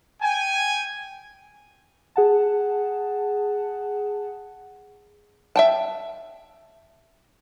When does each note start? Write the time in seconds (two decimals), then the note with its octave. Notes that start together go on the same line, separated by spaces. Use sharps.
0.22 G5 G#5
2.16 G#4 F#5 A5
5.56 E5 G5 A5